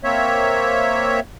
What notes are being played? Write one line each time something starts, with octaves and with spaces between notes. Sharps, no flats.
A#3 C4 C#5 E5